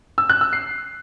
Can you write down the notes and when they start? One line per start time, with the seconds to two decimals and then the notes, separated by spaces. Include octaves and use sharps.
0.18 E6
0.29 F#6
0.41 E6
0.53 C7